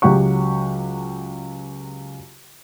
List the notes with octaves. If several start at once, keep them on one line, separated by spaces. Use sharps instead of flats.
C#2 F#3 G4 F#5 C#6